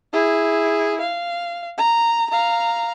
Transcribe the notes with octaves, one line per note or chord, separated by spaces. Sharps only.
E4 G#4
F5
A#5
F5 A#5